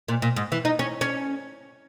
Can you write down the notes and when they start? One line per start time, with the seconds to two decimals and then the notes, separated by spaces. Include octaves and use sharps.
0.08 A#2
0.22 A#2
0.36 G#2
0.52 E3
0.65 D#4
0.79 C#4
1.01 C#4